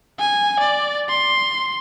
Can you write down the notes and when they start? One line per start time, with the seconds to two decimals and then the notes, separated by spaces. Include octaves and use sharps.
0.20 G#5
0.60 D5
1.09 C6